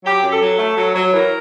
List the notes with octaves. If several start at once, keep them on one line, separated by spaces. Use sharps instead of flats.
F#3 G4
F#2
A4
F#3
A3
F#3
F#3
E3 A#4